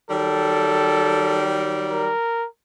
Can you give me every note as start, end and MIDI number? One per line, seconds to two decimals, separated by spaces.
0.10 2.11 51
0.10 2.11 54
0.10 2.11 55
0.10 1.47 69
1.90 2.46 70